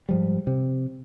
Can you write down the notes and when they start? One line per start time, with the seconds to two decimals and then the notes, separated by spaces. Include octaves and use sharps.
0.09 G#2 F3 G3
0.47 C3